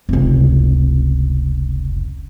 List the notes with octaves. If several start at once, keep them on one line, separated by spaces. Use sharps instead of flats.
F1 C#2